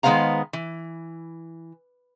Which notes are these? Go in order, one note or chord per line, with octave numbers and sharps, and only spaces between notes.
D#3 G#3 B3 C5 F5 A#5
E3